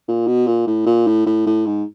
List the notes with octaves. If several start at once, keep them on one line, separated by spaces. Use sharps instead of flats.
A#2
B2
A#2
A2
A#2
A2
A2
A2
G#2